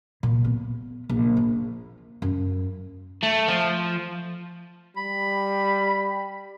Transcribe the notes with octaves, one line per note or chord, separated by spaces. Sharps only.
A#2
B3
A#1
F4
F#2
A3
F3
G3 B5